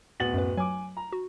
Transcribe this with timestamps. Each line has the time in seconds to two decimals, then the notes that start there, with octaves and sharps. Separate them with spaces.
0.20 D1 B3 F#5 A6 F#7
0.34 F#2 B4
0.57 F#3 G#5 D6
0.97 A#5
1.12 F#4